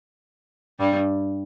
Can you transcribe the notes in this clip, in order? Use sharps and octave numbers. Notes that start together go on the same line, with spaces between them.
G2 G3